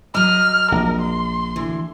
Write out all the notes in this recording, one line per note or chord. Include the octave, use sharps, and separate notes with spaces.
F#3 D#5 F6
A#1 A#4
C6
D2 E3